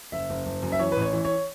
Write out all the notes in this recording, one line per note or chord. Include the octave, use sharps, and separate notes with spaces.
F#1 E5
F#1
F#1
F#2
E5
E3 C#5
A1 B4
C#5
E3
C#5